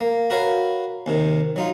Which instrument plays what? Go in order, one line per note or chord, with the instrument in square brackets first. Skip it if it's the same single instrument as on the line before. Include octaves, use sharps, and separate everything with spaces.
[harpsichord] A#3
F#4 A#4 B4 C#5 F5
D#2 C3 D#3
F#3 D#4 F4